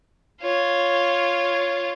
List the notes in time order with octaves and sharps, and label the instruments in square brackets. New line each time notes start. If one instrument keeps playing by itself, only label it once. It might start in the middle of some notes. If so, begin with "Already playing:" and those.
[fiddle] F4 C#5